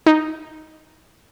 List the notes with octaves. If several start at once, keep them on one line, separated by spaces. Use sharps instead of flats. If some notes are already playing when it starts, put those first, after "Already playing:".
D#4